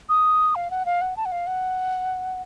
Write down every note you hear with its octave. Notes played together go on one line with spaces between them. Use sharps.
D#6
F5
F#5
F5
F#5
A5
F#5
F5
F#5